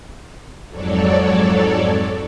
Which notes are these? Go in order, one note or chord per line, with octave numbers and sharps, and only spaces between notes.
F2 G#2 F#3 A4 C#5 D5